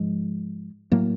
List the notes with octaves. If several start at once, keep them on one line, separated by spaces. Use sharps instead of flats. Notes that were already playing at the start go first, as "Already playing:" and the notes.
Already playing: G#2 F3 G#3
A2 F#3 A#3